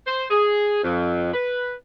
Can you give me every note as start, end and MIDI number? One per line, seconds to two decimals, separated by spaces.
0.06 0.25 72
0.31 0.82 68
0.83 1.30 41
1.33 1.74 71